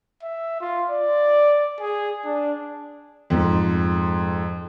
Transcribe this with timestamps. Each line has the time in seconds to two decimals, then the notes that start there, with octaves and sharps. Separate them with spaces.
0.23 E5
0.61 F4
0.90 D5
1.80 G#4
2.25 D4
3.30 F2 G#2